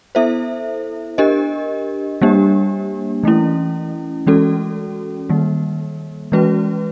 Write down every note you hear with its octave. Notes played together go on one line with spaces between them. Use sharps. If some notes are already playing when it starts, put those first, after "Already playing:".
B3 E4 A4 C5 E5
D4 G4 A#4 D#5
G3 A#3 D4 G4
E3 A3 C#4 E4
E3 G#3 C#4 F#4 A4
D#3 G3 A#3
E3 G#3 C#4 F#4 B4